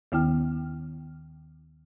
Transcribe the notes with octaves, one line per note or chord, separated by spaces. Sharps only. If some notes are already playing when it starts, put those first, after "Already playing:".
D#2 D#3 B3 E4 G5 F6